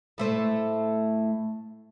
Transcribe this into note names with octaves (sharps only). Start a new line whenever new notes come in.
A2 A3 C5